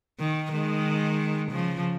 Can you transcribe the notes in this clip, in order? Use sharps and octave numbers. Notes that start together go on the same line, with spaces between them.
D#3
D#3 G#3
C#3 F3